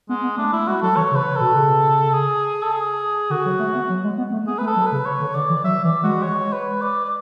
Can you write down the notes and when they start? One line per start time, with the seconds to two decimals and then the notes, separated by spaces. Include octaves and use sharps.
0.09 G#3 B3
0.24 B3
0.37 A3 D4
0.53 A3 E4
0.67 G#3 F#4
0.82 F#3 A4
0.96 E3 C#5
1.11 C#3
1.15 B4
1.36 B2 A4
1.56 C#3
2.14 G#4
2.63 A4
2.72 G#4
3.30 D3 F#4
3.45 F#3
3.59 A3
3.75 B3
3.89 F#3
4.04 G#3
4.18 B3
4.32 A3
4.47 B3 G#4
4.58 A3 B4
4.67 A4
4.76 F#3
4.86 B4
4.92 C#3
5.05 C#5
5.20 D3
5.35 D3 D5
5.49 E3
5.56 D5
5.64 F#3 E5
5.84 E3 D5
6.03 G#3 F#4
6.23 C#5
6.52 B4
6.82 D5
7.04 D5